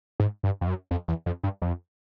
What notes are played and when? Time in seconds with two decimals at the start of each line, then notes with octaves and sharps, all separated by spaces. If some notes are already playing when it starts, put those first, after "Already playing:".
0.20 G#2
0.43 G2
0.61 F2
0.67 F#2
0.91 F2
1.08 E2
1.26 F2
1.43 G2
1.62 F2